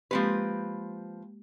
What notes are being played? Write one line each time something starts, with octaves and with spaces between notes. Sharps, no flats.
F3 G#3 A#3 C4 G4 B4